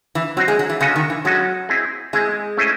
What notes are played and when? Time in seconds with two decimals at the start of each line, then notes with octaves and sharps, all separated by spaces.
0.15 E3
0.37 F#3 C4 F#4 C5 D#5
0.48 G#3
0.59 F#3
0.69 E3
0.81 C#3 G#3 C#4 F#4 A4 D#5
0.96 D#3
1.10 E3
1.25 F#3 G#3 C#4 F#4 A4 D#5
1.69 C4 E4 G#4 D#5
2.13 G#3 C4 E4 G#4 D#5
2.57 A3 C#4 E4 C5 D#5